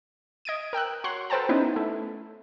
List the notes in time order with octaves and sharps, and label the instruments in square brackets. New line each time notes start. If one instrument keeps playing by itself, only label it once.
[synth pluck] D#5 G#6 D7 D#7
A#4 G5 E6 F#6
F#4 C#5 F#5 C6
A4 B4 C5 G5 A5 A#5
B3 C#4 D#4 E4 B4
A3 E4